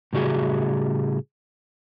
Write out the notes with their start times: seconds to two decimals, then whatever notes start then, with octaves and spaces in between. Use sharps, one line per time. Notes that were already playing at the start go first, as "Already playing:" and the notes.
0.13 A2 C#3 G3 F#4 G#4